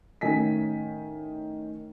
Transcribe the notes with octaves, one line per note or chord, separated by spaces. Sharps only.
A2 D#3 C#4 G#5 B6